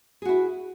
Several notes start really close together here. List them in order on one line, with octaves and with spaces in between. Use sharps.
G#4 F#4 E4